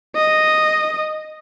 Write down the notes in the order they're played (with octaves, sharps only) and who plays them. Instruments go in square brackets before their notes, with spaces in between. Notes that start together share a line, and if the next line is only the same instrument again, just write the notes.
[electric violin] D#5